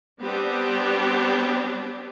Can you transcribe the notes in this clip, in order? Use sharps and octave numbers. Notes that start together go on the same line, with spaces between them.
G3 B3 C4 D4 G4